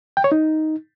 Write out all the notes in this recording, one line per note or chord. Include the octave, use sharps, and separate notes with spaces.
G5
C#5
D#4